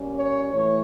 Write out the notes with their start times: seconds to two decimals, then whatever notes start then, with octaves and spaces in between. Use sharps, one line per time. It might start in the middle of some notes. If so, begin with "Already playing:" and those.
Already playing: A#2 G3 C#4
0.14 C#5
0.52 A2 E3 A3 C#5